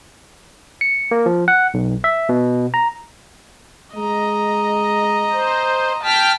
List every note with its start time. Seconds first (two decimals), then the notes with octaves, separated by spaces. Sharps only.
0.81 C#7
1.11 A#3
1.26 F3
1.48 F#5
1.74 B1
2.04 E5
2.29 B2
2.74 A#5
3.95 G#3 D#5 A#5
5.32 C5
6.03 G5 A5 F6 B6